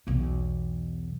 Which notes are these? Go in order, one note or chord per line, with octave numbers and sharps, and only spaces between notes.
B1 E2